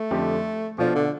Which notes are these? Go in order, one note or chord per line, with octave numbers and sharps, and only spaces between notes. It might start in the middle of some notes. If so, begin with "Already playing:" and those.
Already playing: A3
F2 D3 F3 C4 G4
B2 F3 A3 D4 F4
D3